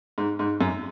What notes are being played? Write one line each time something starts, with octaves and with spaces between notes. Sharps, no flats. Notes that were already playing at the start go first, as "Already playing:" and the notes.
G#2
G#2
F#2